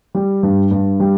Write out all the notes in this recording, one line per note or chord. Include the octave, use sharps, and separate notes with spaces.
G3
G2
G2
G3